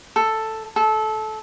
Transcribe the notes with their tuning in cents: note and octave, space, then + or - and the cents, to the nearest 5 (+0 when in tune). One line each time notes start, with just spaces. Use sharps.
A4 +5
A4 -20